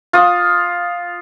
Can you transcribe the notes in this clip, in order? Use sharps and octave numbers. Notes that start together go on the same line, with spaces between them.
F4 D#6